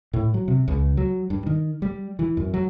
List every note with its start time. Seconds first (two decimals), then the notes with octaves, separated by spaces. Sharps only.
0.13 A2
0.34 F#3
0.48 C3
0.68 C#2
0.97 F#3
1.30 G2
1.47 D#3
1.82 G3
2.19 E3
2.37 F#2
2.54 F#3